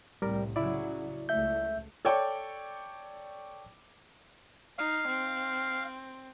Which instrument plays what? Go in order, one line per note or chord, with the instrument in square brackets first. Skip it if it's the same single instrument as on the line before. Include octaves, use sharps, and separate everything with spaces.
[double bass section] C2 A2 C3 [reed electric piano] G3 A#4
[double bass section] C#3 F#3 [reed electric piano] E4 D5
[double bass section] C#2 A3 [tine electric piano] E5 G6
[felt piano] A4 C#5 D5 G5 D6
[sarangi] D#4 [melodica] F5
[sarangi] C4